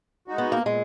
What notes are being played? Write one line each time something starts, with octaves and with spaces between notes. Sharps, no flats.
G#3 D#4 F#4
B3
A#3
A#2 G#3